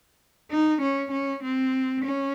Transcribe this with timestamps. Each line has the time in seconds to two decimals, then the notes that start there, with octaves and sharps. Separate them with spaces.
0.51 D#4
0.81 C#4
1.11 C#4
1.43 C4
2.04 C#4